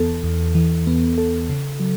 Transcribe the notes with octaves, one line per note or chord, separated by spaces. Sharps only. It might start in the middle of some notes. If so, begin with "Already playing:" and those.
Already playing: E2 E3 B3 A4
E2
E3
B3
A4
C#3
F#3